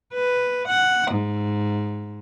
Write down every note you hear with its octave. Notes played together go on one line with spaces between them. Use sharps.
B4
F#5
G#2